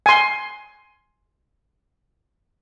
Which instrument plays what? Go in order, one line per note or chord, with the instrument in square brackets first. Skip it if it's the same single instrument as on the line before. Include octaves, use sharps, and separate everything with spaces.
[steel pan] G#5 C6